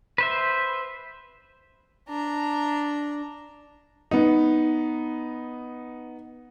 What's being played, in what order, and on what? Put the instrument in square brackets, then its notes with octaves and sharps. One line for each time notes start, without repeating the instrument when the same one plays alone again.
[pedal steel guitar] B4 C5 E5
[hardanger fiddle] D4 A#5
[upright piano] B3 D#4